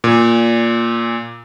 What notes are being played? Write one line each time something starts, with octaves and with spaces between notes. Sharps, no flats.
A#2